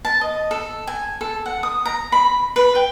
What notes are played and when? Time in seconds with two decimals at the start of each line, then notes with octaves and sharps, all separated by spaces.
0.05 A5
0.21 D#5
0.51 A4
0.87 G#5
1.21 A4
1.46 F#5
1.63 D#6
1.85 A#5
2.12 B5
2.56 B4
2.75 G5